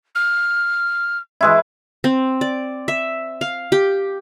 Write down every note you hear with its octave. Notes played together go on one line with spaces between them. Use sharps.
F6
E3 G#3 E4
C4
D5
E5
F5
G4